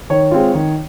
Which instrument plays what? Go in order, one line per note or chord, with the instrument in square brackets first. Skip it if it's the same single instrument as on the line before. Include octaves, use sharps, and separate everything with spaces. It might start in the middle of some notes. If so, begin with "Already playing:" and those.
[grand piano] D#3 C#5
G#3 C4 F4
D#3